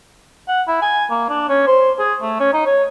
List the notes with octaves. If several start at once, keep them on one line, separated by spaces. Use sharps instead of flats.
F#5
E4
G#5
A#3
D4
C#4
C5
G#4
A3
C#4
D#4
C#5